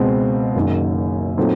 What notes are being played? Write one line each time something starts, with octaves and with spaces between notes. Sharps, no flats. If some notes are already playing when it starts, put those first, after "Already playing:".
Already playing: C#2 B2 G#3 C4
F#1 F#2 D#3
A#2 F#3 A3 C4 D#4